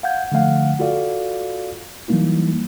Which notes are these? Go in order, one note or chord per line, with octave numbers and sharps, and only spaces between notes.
F5 F#5 G6 G#6
D3 F3 A3 F5 F#5
F4 F#4 A4 D5 F5
E3 F#3 G3 A#3 D#4 E4